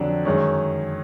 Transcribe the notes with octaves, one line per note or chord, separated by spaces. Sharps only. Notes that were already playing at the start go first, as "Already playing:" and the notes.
Already playing: F2 D3 F#3 D4
F#2 D#3 G#3 C#4